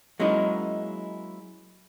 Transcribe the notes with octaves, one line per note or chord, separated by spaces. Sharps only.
F#3 G#3 A#3 C#4 D#4 E4